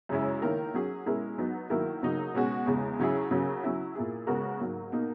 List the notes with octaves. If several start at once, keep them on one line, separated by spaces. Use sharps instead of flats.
F#2 C#3 G#3 C#4 E4
D#3 A#3 E4 A#4
F#3 C#4 G#4
B2 G#3 C#4 E4 A#4
F#3 B3 D#4
D#3 F#3 A#3 E4 A#4
C#3 F#3 A#3 D#4
B2 G#3 C#4 F#4
E2 C#3 G#3
C#3 F#3 C#4 E4 G#4
C#3 F#3 A#3 C#4
F#3 C#4 E4
A#2 A#3 E4 G#4
C#3 G#3 B3 F#4 A#4
G#2 F#3 A#3
B2 A#3 D#4